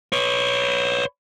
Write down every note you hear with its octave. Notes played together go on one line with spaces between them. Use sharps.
B4 C#5